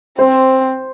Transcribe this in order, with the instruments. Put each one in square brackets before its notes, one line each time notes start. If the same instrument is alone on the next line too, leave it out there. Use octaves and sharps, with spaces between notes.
[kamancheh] C4 [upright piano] C5